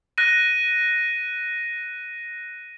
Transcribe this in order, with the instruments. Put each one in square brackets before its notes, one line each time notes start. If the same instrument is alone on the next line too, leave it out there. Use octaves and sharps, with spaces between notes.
[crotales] F#6 A#6 D#7